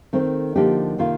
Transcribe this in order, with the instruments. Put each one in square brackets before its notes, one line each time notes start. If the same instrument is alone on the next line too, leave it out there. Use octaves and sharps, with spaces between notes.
[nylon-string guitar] D#3 A3 C4
D3 F3 A#3 D#4 G4
C3 D#3 A#3 F4